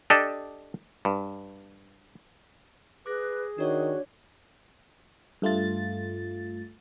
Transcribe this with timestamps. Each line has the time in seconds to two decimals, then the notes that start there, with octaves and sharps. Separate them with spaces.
0.10 D4 G4 A4 D5 D#5
1.05 G2
3.06 G#4 B4 D6 F#6 A#6
3.58 D#3 D4 F#4 C#5 D5
5.42 G2 A3 F4 A6